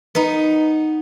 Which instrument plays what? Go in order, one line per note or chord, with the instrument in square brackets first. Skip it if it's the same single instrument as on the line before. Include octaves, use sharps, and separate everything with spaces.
[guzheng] B3 D#4